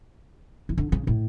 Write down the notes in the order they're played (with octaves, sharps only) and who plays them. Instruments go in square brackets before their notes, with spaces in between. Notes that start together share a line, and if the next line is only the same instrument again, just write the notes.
[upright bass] E3
D3
C#3
A2